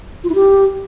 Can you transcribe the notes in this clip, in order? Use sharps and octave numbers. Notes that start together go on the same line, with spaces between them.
F4
E4
G4